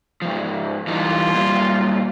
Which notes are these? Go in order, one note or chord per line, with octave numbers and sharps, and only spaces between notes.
G#2 F3
E3 G3 D#4 F4
A#2 F#3 G3